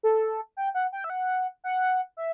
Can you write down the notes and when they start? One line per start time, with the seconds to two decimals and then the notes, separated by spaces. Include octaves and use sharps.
0.03 A4
0.57 G5
0.74 F#5
0.92 G5
1.04 E5
1.10 F#5
1.64 F#5
2.17 E5